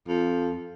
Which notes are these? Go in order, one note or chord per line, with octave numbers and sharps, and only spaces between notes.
F2